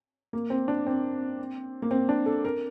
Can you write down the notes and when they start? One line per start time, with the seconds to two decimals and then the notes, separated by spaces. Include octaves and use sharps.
0.33 A#3
0.50 C4
0.68 D4
0.86 C4
1.82 A#3
1.91 C4
2.09 D4
2.26 A4
2.45 A#4